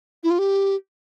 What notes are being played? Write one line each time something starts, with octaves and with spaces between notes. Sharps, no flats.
E4
F4
G4